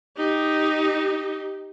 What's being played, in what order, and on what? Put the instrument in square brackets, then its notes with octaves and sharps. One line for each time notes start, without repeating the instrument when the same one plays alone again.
[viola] D#4 G4